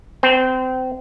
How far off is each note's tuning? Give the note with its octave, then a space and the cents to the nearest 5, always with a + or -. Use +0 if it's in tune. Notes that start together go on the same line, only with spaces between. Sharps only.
C4 -25